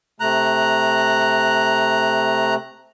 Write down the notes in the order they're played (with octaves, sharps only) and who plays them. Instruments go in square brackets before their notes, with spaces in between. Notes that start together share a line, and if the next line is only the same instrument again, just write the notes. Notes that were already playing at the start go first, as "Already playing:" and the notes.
[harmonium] C3 A3 [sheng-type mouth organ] A#5 F#6